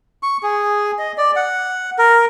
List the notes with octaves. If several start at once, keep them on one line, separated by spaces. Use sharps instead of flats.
C#6
G#4
D#5
D5
F#5
A#4